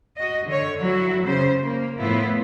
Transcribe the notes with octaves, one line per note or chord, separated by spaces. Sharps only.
F#4 D#5
D3 C#5
F#3 E4 F#4
C#3 C5
A#3
A2 F3 B3 E4 F4